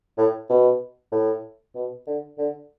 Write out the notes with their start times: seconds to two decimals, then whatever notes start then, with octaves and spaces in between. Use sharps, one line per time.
0.18 A2
0.49 B2
1.12 A2
1.75 B2
2.07 D3
2.38 D3